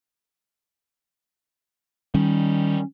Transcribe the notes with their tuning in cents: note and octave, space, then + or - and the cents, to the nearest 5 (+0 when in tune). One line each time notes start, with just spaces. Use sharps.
D#3 +0 G3 +0 C#4 +0